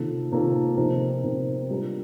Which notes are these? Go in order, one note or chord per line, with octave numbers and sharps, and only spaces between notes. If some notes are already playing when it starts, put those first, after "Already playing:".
Already playing: C3 D#3 A#3 F4 A4
C3 D#3 A#3 F4 A4
C3 F3 C4 D#4 A#4
C3 F3 C4 D#4 A#4
G3 D4 F4 A#4